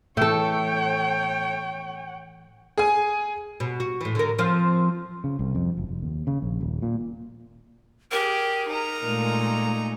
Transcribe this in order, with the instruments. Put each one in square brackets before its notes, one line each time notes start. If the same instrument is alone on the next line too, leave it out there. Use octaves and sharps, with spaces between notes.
[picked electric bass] A2 E3 [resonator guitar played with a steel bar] A3 A4 [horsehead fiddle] C#5 G5
[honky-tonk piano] G#4 G#5
[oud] B2
F#4
A2 E3
D3 A#4
F3 C4 F4
[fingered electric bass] C#3
C2
F2
F#1
F1
D#2
C#3
A#1
D#1
A#2
[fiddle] G4 G#4 [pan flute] A#4
[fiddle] D#4 A#5
[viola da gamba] A#2 G#3 A3